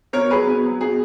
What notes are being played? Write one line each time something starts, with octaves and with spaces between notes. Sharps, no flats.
B2 A#4 C#5
F#3 G#4 B4
B2
F#3
B2 G#4